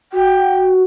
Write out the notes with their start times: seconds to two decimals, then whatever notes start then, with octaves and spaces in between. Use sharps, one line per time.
0.13 F#4 G5